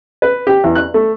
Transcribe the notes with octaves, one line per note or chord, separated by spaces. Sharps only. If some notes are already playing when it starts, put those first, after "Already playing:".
B4
G4
E2
F#6
A3